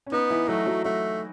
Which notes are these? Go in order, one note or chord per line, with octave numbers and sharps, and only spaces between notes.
C#4
B3 D#4
E3 E4
F#3 A3 F#4
F#3 F#4
F#3 A3 F#4